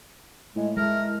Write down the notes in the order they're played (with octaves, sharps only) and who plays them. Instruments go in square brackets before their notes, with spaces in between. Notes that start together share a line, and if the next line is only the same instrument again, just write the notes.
[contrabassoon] A2 [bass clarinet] G#3
[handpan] G#3 [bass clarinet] A3 [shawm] A#4